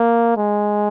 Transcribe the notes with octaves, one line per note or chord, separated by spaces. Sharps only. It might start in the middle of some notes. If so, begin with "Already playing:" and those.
Already playing: A#3
G#3